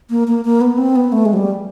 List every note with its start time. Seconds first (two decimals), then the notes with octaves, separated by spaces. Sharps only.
0.10 A#3
0.28 A#3
0.45 A#3
0.61 B3
0.78 C4
0.96 B3
1.12 A3
1.25 G#3
1.33 F#3
1.37 G3